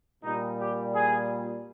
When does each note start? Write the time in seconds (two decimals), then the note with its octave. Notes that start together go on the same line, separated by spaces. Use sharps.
0.24 A#2 G3 D#4
0.59 G4
0.94 G#4